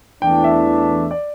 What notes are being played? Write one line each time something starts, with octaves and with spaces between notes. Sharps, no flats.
E2 E3 A3 D4 G5
E5
D5